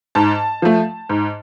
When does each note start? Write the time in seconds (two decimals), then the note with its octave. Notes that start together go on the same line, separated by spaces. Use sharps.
0.15 G#2 A5
0.62 F3 A3
1.09 G#2